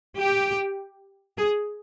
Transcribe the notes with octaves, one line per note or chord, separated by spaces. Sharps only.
G4
G#4